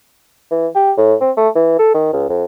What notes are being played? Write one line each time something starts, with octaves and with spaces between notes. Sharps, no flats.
E3
G4
A2
C4
A3
E3
A4
D#3
C#2
F2